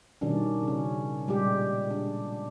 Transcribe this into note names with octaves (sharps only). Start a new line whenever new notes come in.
B2 D#3 G3 C#4 D4
C#3 C#4
A#2 G3 G#3 G4
D4